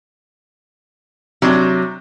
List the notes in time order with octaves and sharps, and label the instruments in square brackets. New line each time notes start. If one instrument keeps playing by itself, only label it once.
[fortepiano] C3 D4 D6 [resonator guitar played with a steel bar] F#3